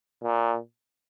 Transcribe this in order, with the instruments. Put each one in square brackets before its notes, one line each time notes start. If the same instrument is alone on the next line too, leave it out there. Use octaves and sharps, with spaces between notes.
[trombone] A#2